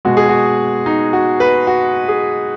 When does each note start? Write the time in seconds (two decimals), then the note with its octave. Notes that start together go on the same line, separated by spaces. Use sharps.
0.05 B2 G#3 F#4
0.17 G#4
0.29 F#4
0.86 D#4
1.13 F#4
1.40 B4
1.67 F#4
2.08 G#4